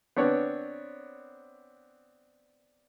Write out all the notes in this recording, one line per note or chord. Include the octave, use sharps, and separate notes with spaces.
B3 C4 D4 C#5